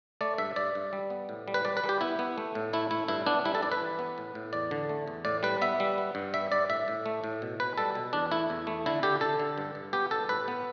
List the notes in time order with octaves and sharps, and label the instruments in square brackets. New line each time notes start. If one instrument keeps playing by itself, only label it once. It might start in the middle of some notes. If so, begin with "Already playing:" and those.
[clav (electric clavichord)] A3 D5
G2 E5
G2 D5
G2
G3
B3
A2
G3
B4
G3 D5
B4
G3
G4
B3 E4
B3
A3
A2
A3 E4
A3 E4
G2 E4
B3 D4
G3 E4
A4
G2 D5
B4
E3
B3
A2
A2
E2 D5
D3
A3
E2
A2 D5
G3 B4
B3 E5
G3
B3
G2
G3 E5
G2 D5
A2 E5
A2
A3
A2
B2
B2 B4
G3 A4
B2
E2 D4
A3 E4
E2
A3
D3 E4
D3 G4
D3 A4
D3
G2
G2
B3 G4
G2 A4
A2 B4
B3